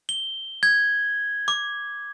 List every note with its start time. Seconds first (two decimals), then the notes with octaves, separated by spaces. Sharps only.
0.09 G7
0.63 G#6
1.48 D6